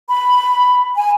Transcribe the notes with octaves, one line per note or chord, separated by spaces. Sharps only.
B5
G#5